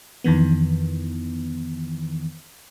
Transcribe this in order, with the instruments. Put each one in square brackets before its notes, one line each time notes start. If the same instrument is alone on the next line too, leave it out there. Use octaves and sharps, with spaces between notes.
[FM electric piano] F2 D#3 E3 B3